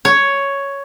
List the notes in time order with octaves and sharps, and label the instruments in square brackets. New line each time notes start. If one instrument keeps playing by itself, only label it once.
[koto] C#5